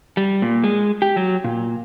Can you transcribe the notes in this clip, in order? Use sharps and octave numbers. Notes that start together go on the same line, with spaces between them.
G3
A#2
G#3
G4
F#3
A#2